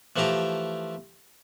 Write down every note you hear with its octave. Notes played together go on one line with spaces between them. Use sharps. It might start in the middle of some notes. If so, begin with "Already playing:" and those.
E3 F3 A3 G4 A#5